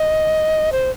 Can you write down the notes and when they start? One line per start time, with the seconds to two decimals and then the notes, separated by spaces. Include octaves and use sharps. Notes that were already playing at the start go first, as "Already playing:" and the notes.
Already playing: D#5
0.72 C5